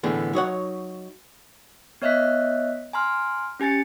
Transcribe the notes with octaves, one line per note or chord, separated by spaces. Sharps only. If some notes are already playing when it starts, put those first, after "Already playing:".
A2 D3 E3 B3 G#4
F#3 D#4 C#5 F#5
B3 C#5 D#5 E5 F#6 B6
G#5 A#5 C6 F6
C#4 G4 G#5 A6 C#7